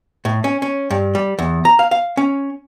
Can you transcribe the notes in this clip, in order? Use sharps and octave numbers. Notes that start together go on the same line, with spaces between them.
A2
C#4
C#4
G2
G3
E2
A#5
F5
F5
C#4